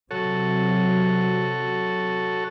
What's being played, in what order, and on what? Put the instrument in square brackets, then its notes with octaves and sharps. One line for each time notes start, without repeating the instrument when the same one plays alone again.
[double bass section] C3 F#3 [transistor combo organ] F#4 A4 C#5